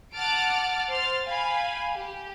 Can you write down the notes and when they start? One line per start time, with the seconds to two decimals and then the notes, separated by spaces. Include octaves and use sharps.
0.14 F#5 A5 D6 F6 A6 D7
0.89 C5 C6 F6 A6
1.26 F5 G5 G#5 B5
1.94 G4